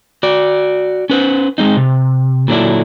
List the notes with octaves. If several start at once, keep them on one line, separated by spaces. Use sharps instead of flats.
F#4 D5
C#4 B4 C5
G#3 C4 D#4
C3
A#2 D3 F#3 A#3 D4 E4